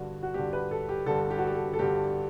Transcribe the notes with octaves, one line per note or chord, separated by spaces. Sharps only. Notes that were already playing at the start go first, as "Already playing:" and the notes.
Already playing: G2 D3 F#4
F#4
G2 D3 G4
B4
A4
G4
G2 D3 A4
G4
F#4
G4
A4
A4
G2 D3 G4